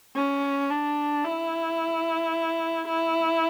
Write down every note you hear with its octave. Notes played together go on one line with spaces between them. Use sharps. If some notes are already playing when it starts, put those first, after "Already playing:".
C#4
D4
E4
E4